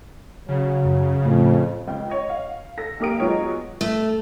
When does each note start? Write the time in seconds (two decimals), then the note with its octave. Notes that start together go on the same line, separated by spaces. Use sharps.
0.49 C#3 F#3
0.85 F#2
1.25 F2 A2
1.88 C#2 G5
2.10 C#5 D#5
2.29 F5
2.77 A4 A#6
2.99 B1 A#3 G4 D#6 D7
3.19 F#3 G#3 B3 F4 C#5 D#5
3.81 A3